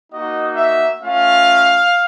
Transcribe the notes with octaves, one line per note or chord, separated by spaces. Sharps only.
A#3 D#4 F#4 D#5
E5
A3 C#4 F4 F5